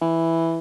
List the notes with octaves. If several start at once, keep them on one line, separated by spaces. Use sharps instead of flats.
E3